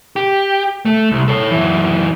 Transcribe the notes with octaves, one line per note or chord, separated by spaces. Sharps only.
G4
A3
C2
A4 C#5
F#2 E3